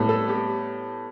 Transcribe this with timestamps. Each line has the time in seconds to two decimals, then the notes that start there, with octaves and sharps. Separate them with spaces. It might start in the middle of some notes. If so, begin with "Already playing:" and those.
Already playing: A2 G3 B3
0.09 A4
0.28 G4